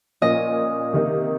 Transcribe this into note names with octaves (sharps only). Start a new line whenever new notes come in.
A#2 F3 A#3 C#4 D#5
C3 D#3 A#3 D#4